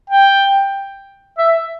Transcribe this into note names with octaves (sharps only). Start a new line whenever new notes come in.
G5
E5